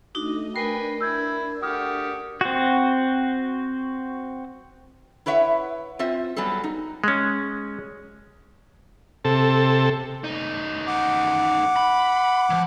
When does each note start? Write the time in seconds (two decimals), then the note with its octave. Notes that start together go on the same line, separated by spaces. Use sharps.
0.15 A3 D4 D#4 F#4 D#5
0.56 D4 A#4 B4 G5 G#5 C7
1.01 E4 E6 G6 G#6
1.62 A3 F#4 G4 D#6 F6
2.41 C4 F#4
5.26 E4 B4 C#5 E5 F#5
5.99 C4 F4 C5 E5
6.36 F#3 G3 B3 G#4 A4
6.64 D#4
7.04 G#3 C#4
9.25 C3 A4
10.24 F#2 D#4
10.87 F#5 D6
11.76 B5
12.50 E3 F3